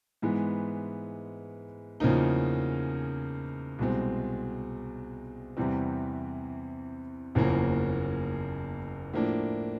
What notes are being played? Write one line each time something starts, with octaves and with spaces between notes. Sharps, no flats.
G#2 E3 G#3 B3
E2 C#3 F3 A#3 D#4
C2 B2 G#3 C4
E2 C3 E3 G3 C4
F#1 E2 C#3 F3 A#3
A2 F3 A#3 D4